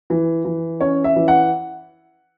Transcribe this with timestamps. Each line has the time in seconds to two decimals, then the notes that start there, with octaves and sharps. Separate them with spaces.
0.10 E3
0.45 E3
0.81 C#4 C#5
1.04 E5
1.16 E3
1.28 F#5